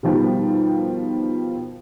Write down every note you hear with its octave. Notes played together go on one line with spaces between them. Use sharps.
B2 D#3 F3 G3